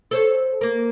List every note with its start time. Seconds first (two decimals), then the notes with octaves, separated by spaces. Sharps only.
0.11 A4 C5 C#5
0.61 A#3 A#4